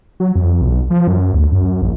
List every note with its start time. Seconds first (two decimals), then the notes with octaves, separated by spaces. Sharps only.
0.20 F#3
0.35 F2
0.61 B1
0.90 F3
1.08 F#2
1.34 D2
1.52 F#2
1.82 A#1